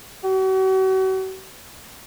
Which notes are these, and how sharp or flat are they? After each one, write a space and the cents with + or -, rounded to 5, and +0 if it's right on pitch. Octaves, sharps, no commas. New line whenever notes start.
F#4 +40